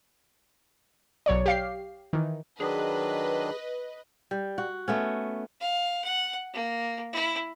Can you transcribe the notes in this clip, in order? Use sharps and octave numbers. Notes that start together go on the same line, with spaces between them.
B1 F#3 C#5 D5
G4 F5 C7
D#3 E3
D#3 F#3 D4 G#4 B4 D#5
G3
F#4
A3 B3 C#4
F5
F#5
A#3
E4